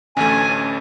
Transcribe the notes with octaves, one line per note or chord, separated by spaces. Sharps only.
A1 D2 A3 C#4 G#5